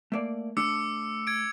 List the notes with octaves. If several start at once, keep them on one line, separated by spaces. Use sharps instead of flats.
A3 A#3 D5
A3 D4 D6 E6 C#7
G#6 D7